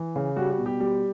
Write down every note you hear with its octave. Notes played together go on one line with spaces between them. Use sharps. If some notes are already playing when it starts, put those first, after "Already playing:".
Already playing: E3
C#3
G3 F#4
F#4
B2
G4
G3